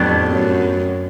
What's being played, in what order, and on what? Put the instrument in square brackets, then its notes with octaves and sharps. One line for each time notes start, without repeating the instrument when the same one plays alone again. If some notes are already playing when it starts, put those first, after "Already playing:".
Already playing: [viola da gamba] F2 [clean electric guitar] A2 F#3 B3 D4 G4
[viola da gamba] F#2